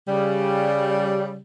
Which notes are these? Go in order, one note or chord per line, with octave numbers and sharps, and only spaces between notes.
C#3 G3